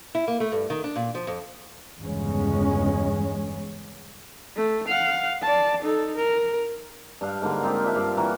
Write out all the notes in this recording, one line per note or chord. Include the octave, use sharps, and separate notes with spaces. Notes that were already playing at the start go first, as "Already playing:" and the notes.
E4
A#3
A3
G2
D#3
D4
A#2
F3
F2
G1 E2 G2 C#3 G#3 C#4
A3
F5 F#5
D5 A5
D#4 A4
A#4
G2 D4 F5
G#2 D3 A#3 A#5
C4 D#4 F4 G4
D4 F4 E5 A5
G2 F5 D6
E3 A#3 F#4 A#4